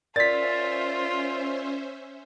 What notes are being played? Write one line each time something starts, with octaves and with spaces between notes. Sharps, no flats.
C#4 F4 A#4 C5 D5 E5 A6 B6